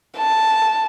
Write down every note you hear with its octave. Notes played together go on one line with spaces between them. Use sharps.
A5